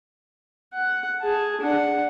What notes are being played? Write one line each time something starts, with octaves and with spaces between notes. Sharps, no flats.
F#5
G#4 A5
D4 F#5